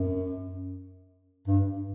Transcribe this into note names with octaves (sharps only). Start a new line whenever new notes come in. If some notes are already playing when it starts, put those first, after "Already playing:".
Already playing: F#2
G2